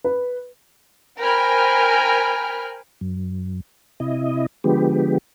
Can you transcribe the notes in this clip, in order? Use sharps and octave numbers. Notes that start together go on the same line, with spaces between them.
B4
A#4 C5 G5 G#5 B5 F6
F#2
C3 E4 D#5
D3 F3 G#3 B3 G4